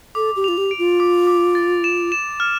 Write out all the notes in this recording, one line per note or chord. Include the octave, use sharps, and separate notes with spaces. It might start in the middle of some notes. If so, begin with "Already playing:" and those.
A4 D6
G4
F4 F7
G4
D7
F4
D6
D6
A6
E7
E7
F6